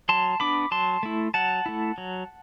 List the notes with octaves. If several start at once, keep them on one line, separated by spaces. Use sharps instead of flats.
F#3 A5 C6
B3 D4 B5 D6
F#3 A5 C6
A3 E4
F#3 F#5 A5
A3 E4
F#3